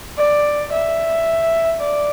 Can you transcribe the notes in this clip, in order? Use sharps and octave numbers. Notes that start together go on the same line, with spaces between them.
D5
E5
D5